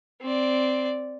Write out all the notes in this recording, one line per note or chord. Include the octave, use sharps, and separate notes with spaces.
C4 D5